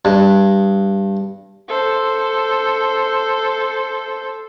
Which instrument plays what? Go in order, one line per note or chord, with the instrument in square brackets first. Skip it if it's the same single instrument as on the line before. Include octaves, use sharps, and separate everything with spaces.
[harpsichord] G2
[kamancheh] A4 C5